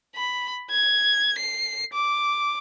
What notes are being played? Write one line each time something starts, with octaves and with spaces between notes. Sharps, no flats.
B5
G#6
C7
D6